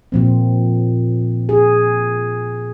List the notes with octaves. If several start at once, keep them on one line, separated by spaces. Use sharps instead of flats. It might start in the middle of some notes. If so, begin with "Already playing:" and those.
A#2 F3 C4
G#4